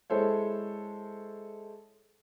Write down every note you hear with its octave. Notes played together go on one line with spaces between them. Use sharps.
G#3 E4 A4 C5 C#5